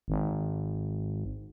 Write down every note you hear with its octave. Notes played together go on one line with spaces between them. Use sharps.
G#1